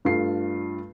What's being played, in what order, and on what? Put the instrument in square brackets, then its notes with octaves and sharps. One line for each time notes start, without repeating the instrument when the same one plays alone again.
[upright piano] G2 A3 F4 C7